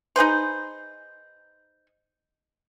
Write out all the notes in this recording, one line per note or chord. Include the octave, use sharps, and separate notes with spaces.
D#4 G#4 B4 C5